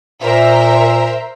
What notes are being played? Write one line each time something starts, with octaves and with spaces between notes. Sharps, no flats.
A#2 A#4 C5 E5